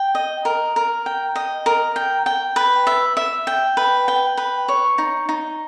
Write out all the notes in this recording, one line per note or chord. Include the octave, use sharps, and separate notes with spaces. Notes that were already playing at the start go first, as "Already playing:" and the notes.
Already playing: G5
D#5
A#4
A#4
G5
D#5
A#4
G5
G5
B4
E5
E5
G5
B4
G5
B4
C#5
D#4
D#4